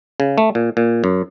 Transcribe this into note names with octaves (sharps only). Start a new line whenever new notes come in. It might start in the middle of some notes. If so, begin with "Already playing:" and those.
C#3
A3
A#2
A#2
F#2